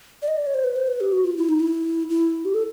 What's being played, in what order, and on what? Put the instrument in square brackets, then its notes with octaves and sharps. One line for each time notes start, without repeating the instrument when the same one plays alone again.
[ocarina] D5
D#5
D5
C#5
C5
B4
C5
B4
G4
F#4
F4
E4
D#4
E4
E4
G4
A4